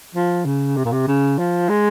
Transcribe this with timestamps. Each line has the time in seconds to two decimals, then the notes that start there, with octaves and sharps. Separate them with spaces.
0.15 F3
0.46 C#3
0.77 C3
0.85 A#2
0.92 C3
1.08 C#3
1.38 F3
1.69 G#3